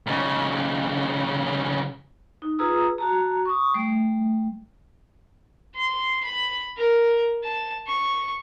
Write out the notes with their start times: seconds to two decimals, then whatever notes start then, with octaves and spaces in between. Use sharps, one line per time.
0.07 B1 C#3
2.42 D#4
2.59 F4 G#4 B4 A#5 D#6 E6
2.98 F#4 A5 A#5
3.45 C#6 D#6
3.74 G3 A3
5.75 C6
6.24 B5
6.77 A#4
7.44 A5
7.88 C#6